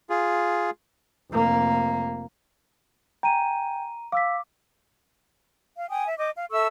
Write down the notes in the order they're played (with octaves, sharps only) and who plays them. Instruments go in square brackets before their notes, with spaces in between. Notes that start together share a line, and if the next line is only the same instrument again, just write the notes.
[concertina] F4 G#4
[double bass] F1 A#3
[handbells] G5 G#5 [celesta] A#5 D#7
[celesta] F5 E6 B6 [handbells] D6
[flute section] F5
G5 G#5 D#6
E5
D#5 D6 G6
F5
A4 E5 C#6 E6